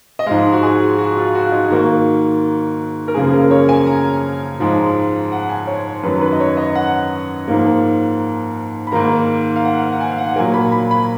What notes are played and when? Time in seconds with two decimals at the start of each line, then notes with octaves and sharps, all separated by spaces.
0.19 D#5
0.26 G#2 F3 G#3 F5
0.52 F#4
0.63 G#4
0.98 F#4
1.17 F4
1.35 F#4
1.46 F4
1.52 D#4
1.70 G#2 D#3 A#3 F#4
3.08 A#4
3.14 F#2 C#3 F3 A#3 G#4
3.33 A#4
3.51 C#5
3.69 G#5
3.86 A#5
4.60 G#2 F3 G#3
5.32 F#5
5.49 G#5
5.67 C#5
6.03 F#2 D#3 F#3 B4
6.21 B4
6.32 D#5
6.40 C#5
6.57 D#5
6.75 F#5
7.48 G#2 F3 A#3
8.87 B5
8.92 G#2 D#3 A#3 A#5
9.56 F5
9.65 F#5
9.82 F5
9.92 F#5
10.01 G#5
10.11 F5
10.18 F#5
10.36 A#2 F#3 A#3 G#5
10.54 B5
10.72 B5
10.91 B5